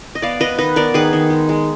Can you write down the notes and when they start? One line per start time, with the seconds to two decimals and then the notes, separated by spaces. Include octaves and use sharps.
0.15 D#5
0.22 B3 D5 F5
0.40 B3 B4 D#5
0.58 D#3 B4 D#5
0.76 B3 A#4 D5
0.94 D#3 G#4 B4
1.13 D#3
1.30 G#3
1.49 G#3